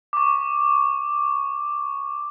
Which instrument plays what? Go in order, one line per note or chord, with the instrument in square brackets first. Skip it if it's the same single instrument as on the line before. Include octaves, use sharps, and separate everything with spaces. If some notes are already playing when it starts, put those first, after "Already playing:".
[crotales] C#6 D6